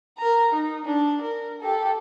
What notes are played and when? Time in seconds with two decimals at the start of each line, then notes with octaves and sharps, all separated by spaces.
0.18 A#4 A#5
0.53 D#4
0.85 D4
1.21 A#4
1.61 G4 A4